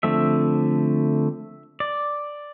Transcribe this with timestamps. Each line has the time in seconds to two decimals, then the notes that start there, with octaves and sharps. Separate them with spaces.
0.03 D3 F3 A3 C4 E5
1.80 D5